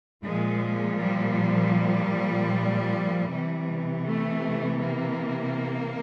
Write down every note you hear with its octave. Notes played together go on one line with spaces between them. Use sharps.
A#2 F3 G#3
G3
C3 E3
A3
A#3